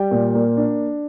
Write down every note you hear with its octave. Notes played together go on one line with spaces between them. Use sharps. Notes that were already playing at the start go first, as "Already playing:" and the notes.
Already playing: G3 G5
A#2
A#3
D4